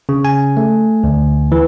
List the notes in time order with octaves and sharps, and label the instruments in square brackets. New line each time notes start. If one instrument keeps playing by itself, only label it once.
[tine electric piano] C#3
G#5
A3
D2
E3